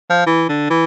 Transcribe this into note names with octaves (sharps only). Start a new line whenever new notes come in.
F3
E3
D3
E3